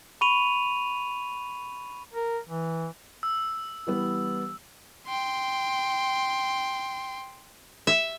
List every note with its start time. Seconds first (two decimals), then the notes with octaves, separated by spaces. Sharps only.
0.21 B5 C#6 D#7 F7 F#7
2.14 A#4
2.49 E3
3.23 E6
3.87 E3 G3 B3
5.07 G5 C6
7.87 E5